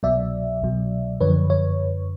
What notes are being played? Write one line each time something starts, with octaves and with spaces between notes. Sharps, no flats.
C2 B2 F#3 D5 E5
C2 B2 F#3
F#2 D3 F3 B4 C#5
C#5